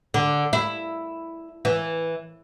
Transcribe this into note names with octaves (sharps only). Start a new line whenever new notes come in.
D3
E4
E3